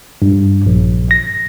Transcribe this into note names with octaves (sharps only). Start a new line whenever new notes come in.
G2
A#1
A#6